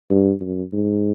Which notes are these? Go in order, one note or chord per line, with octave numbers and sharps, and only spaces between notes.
G2
F#2
G#2